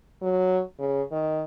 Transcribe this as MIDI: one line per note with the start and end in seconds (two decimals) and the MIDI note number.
0.22 0.62 54
0.79 1.02 49
1.12 1.44 51